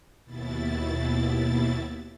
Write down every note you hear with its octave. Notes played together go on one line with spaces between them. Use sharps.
D#2 B2 E4 A6